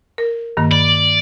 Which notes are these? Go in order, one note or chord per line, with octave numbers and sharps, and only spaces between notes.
A#4
G2 D#3 A#3
D5 B5